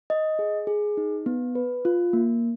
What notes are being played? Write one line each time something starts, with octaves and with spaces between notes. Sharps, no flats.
D#5
G#4
G#4
D#4
B3
B4
F4
A#3